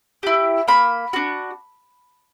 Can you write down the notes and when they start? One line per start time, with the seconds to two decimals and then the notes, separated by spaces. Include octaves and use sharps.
0.23 E4 G4
0.68 A#3 B5
1.13 D4 F#4